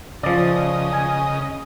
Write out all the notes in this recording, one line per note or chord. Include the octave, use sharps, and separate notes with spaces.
C#3 F3 D5 D#5
G#5